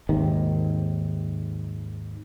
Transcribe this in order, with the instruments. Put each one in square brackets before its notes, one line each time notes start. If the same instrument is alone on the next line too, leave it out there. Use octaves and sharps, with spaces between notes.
[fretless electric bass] G#1 D#2 C3 D#3